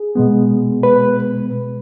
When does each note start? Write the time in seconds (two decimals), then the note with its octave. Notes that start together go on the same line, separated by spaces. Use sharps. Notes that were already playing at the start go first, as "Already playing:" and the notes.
Already playing: G#4
0.15 B2 G#3 B3
0.83 B4